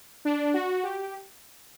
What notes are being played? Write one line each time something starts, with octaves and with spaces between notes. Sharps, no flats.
D4
F#4
G4